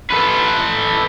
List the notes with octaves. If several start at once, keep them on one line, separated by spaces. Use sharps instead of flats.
A4 B4